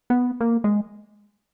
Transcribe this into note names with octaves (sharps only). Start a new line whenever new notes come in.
B3
A#3
G#3